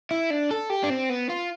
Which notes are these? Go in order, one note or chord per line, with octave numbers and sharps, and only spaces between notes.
E4
D4
A4
G4
D4
C4
B3
F4